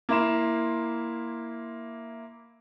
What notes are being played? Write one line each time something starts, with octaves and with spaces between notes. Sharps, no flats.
A#3 E4 C6 E7